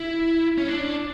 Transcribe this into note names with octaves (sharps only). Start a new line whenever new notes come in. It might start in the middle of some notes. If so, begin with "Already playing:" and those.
Already playing: E4
C#4
D4